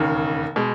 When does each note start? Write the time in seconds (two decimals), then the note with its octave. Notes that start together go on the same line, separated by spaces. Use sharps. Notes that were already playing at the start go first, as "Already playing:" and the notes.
Already playing: E1 D#2 C#3
0.56 B2 G#3